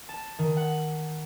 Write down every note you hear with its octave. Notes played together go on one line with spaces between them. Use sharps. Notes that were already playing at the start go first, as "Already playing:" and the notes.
A5
D#3
F#5